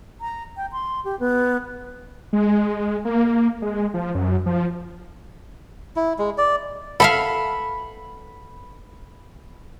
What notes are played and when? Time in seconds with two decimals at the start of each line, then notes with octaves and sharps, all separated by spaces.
0.21 A#5
0.57 G5
0.72 C6
1.05 G4
1.20 B3
2.33 G#3
3.05 A#3
3.62 G#3
3.94 F3
4.15 F#2
4.46 F3
5.96 E4
6.19 G#3
6.38 D5
7.00 A4 E5 F5 B5